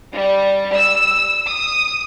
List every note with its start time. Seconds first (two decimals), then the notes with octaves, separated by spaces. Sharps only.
0.13 G3
0.75 E6
1.47 D#6